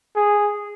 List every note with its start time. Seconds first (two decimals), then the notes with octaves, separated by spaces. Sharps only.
0.16 G#4